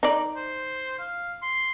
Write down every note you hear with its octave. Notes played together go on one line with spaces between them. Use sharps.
D#4 D5
C5
F5
C6